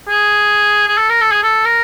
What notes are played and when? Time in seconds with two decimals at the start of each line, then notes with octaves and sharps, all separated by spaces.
0.08 G#4
0.88 G#4
0.98 A4
1.10 A#4
1.21 A4
1.32 G#4
1.43 A4
1.65 A#4